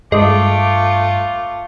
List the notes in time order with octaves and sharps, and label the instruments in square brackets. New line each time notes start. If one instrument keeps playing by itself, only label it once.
[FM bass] G2 [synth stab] G#3 [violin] A3 F4 [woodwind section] D6